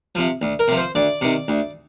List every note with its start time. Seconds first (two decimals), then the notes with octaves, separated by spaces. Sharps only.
0.15 C3 F3
0.42 D2
0.59 A#4
0.68 C3 F3
0.77 C5
0.95 D2 D5
1.21 C3 D#3
1.48 D2